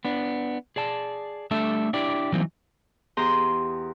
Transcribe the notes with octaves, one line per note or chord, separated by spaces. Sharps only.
B3 D4
G#4 D5 A5
G3 A3 D4 A4 E5
D4 E4 G4 D5
E3 F#3 G3 A#3 C4 D#4
E2 G4 G#4 A#5 C6